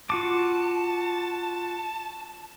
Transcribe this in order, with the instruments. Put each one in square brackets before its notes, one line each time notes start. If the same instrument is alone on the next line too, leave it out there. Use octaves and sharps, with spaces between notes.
[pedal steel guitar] F4 F#4 D6 [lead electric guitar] A5